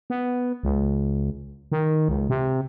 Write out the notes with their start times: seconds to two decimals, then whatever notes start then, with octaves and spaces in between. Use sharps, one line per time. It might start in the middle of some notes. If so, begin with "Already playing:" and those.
0.10 B3
0.63 C#2
1.72 D#3
2.09 C#2
2.29 C3